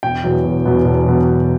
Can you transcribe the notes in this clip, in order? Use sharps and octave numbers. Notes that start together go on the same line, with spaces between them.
E1 G5
E2 B2 F#3 B3
E1
E2 B2 F#3 B3
E1
E2 B2 F#3 B3
E1